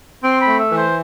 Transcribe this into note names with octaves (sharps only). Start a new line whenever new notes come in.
C4 C6
B5
A3
E5
E3
C5